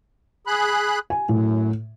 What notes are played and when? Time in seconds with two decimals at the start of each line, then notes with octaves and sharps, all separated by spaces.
0.47 G#4 B5 F#6
1.10 G#5
1.29 F#2 A2